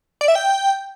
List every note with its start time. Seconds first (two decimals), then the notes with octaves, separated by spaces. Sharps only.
0.21 D5
0.28 E5
0.35 G5